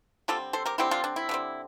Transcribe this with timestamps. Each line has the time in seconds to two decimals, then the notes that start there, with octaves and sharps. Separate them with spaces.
0.28 D3 G3 C4 F4 A4
0.53 A4 C5
0.66 G4 A#4
0.78 D3 G3 C4 E4 G4
0.91 D4 F4
1.04 D4
1.16 E4
1.29 D3 G3 C4